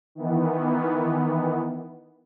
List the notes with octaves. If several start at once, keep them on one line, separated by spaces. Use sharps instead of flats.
D#3 E3 B3